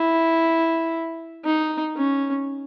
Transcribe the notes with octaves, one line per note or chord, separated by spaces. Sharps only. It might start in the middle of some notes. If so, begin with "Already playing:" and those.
Already playing: E4
D#4
C#4